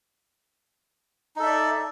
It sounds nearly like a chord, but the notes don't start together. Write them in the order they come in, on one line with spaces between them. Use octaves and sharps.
D#4 A4 E5 D5